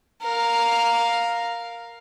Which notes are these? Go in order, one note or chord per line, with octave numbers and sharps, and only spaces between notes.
A#4 F5